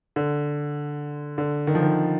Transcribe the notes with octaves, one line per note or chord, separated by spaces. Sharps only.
D3
D3
D#3
F3
D#3